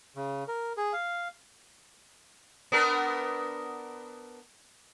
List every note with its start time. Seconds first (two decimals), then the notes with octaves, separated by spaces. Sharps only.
0.16 C#3
0.48 A#4
0.77 G#4
0.93 F5
2.72 B3 D4 A#4